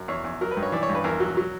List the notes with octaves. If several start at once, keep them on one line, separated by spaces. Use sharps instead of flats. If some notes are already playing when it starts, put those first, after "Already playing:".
Already playing: F#2
E2 C#5
E2
F#3 A#4
B4
G2
C#5
E3 D5
C#5
G2
B4
E2 A#4
F#3
F#3